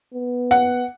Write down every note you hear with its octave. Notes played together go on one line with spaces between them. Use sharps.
B3
F#5